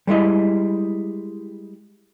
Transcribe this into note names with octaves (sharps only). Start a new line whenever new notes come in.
G3 G#3 E4 D#5